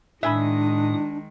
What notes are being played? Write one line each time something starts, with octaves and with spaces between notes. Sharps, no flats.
A2 D#3 G#3 D4 E5 G#5 B5 D#6